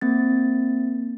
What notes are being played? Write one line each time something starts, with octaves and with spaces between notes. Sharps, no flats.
A#3 C4 A6